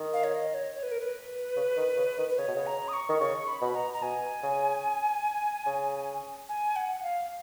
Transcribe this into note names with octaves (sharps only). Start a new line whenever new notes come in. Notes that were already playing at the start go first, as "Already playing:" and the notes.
Already playing: D#3
F5
C#5
D#5
C#5
C#5
B4
A#4
B4
C#3
D#3
C#3
D#3
B4
C#3 C#5
B2
C#3
A#5
D#6
C#6
D#3
C#3 C#6
B5
B2
A#5
A#5
B2 G#5
C#3
C#3
G#5
F#5
F5